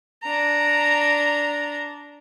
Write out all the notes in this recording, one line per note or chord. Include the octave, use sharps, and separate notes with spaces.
D4 A#5